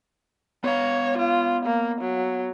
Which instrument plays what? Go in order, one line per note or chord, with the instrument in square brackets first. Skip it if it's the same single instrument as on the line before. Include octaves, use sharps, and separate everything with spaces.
[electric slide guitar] B3 F5 [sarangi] C#5
[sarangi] F4
A#3
F#3